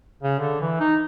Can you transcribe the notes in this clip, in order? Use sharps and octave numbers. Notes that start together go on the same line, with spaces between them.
C#3
D3
E3
D#4